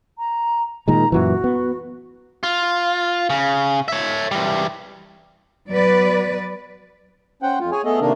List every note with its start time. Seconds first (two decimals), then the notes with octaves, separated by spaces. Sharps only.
0.18 A#5
0.88 A#2 D#3 G#3 A#5
1.12 F#2 A#2 E3 F#4
1.44 B3
2.43 F4
3.30 C#3
3.88 C#5 E5
4.31 E3 G3
5.71 F#3 B3 B4 D5
7.43 C#4 C5 F#5 G5
7.60 F2 F4
7.72 G#4 C#5 G#5
7.85 A3 B3 G#4 A4 D#5
8.01 C3 D#3 A3 A#3 D4 A#4